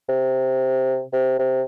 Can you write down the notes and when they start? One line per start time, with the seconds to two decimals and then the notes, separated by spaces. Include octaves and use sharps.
0.09 C3
1.13 C3
1.39 C3